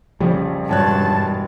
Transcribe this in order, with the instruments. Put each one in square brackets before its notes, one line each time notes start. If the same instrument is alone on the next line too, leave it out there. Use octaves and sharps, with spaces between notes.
[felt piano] A#1 F2 [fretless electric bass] C#3 F3 G3
[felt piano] E1 C#5 F#6 [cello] G2 [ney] A5